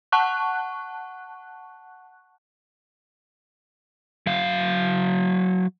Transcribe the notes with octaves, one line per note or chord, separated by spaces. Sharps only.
F#5 A5 C#6 F#6
F#3 F5